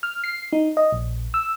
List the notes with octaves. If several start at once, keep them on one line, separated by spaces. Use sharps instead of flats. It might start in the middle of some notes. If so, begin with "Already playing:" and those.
F6
C7
D#4
D#5
A#1
E6